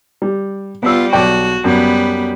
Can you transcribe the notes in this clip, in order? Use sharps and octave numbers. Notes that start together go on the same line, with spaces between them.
G3
G3 B3 F4 E6
B1 F#4 D5 G5
F#2 G3 B3